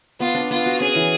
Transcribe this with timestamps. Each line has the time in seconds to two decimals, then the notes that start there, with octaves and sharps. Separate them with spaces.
0.20 B3 F4
0.35 D4
0.50 B3 F4
0.66 F#4
0.80 C#4 G#4
0.96 E3